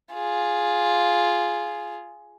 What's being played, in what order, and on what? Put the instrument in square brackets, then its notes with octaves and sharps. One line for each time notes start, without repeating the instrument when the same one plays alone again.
[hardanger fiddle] F4 G#4